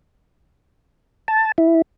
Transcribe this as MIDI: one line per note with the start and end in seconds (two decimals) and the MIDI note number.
1.28 1.52 81
1.58 1.82 64